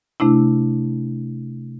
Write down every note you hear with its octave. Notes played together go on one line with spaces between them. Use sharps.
C3 A3 D4 E4